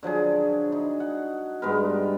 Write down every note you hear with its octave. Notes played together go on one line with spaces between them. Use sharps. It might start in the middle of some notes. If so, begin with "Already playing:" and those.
D3 F3 F#3 G#4
D#4
F#5
G2 G#3 B3 A#4
G5